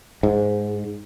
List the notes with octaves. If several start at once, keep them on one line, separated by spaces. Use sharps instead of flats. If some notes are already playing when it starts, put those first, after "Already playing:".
G#2